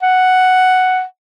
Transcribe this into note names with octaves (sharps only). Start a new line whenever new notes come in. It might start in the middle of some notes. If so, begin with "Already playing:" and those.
F#5